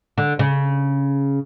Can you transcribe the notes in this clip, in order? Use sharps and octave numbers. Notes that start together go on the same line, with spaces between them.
D3
C#3